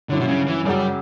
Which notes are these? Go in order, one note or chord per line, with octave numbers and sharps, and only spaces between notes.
G2 D3 F#3 C#4 E4
B2
C#3
E3
F#2 C#3 F#3 G3